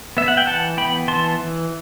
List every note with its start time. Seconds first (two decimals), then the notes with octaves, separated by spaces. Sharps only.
0.17 B3 E5
0.28 F#5
0.37 G5
0.47 E3 F#5 A5
0.77 B3 G5 B5
1.08 E3 A5 C6
1.39 E3